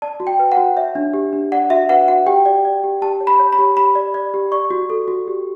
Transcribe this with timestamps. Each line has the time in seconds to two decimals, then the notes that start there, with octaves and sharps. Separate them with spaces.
0.02 D5 A5
0.20 F#4
0.27 G5
0.39 B4
0.52 F#5
0.57 F#4
0.76 C#5 E5
0.95 D4
1.14 G4
1.33 D4
1.52 D5 F#5
1.70 F#4 E5
1.89 B4 F#5
2.08 F#4 F#5
2.26 G4 G5
2.45 D5
2.65 D5
2.84 G4
3.02 G4 A5
3.21 C#5
3.27 B5
3.39 C#5
3.53 B5
3.59 G4
3.77 G4 B5
3.95 D5
4.14 D5
4.34 G4
4.52 D5 C#6
4.70 F#4
4.90 A4
5.08 F#4
5.28 G4